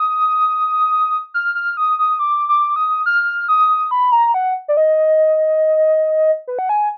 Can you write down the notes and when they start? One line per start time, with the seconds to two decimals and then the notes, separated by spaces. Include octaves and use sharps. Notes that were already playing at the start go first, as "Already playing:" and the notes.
Already playing: D#6
1.34 F6
1.55 F6
1.77 D#6
1.99 D#6
2.19 D6
2.49 D6
2.76 D#6
3.06 F6
3.48 D#6
3.91 B5
4.12 A#5
4.34 F#5
4.68 D5
4.77 D#5
6.48 B4
6.59 F#5
6.69 G#5